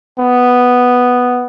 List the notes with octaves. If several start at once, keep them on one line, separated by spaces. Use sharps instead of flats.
B3